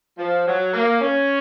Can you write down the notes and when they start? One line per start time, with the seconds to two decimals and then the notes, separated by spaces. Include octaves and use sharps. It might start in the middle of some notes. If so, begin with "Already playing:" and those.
0.17 F3
0.45 F#3
0.73 A#3
1.01 C#4